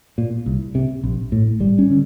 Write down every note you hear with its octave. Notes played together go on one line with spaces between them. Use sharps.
A#2
C2
C3
A#1
A2
G#1 G3
C#4
D3